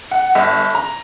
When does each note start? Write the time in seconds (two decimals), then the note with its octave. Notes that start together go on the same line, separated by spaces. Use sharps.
0.11 F#5
0.35 G1
0.75 A#5